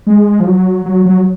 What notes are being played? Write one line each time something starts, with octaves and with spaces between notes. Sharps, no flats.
G#3
F3
F#3
F#3
F#3